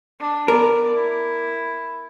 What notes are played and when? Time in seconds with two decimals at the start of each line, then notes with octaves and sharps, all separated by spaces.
0.20 D4
0.48 B3 A#4 D5
0.95 E4